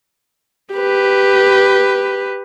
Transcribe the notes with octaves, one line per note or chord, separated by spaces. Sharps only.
G4 B4